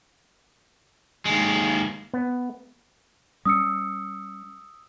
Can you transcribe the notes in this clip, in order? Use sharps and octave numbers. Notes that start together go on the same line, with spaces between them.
D#2 G#3
B3
G3 C#4 D#6 E6 C#7